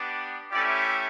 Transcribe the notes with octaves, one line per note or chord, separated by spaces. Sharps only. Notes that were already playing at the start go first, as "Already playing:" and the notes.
Already playing: B3 D4 G4
A3 C#4 E4 G4 D5